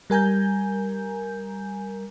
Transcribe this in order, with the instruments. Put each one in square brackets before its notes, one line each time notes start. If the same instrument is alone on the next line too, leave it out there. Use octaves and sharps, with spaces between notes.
[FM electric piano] G3 A#4 G#5 A#5 G6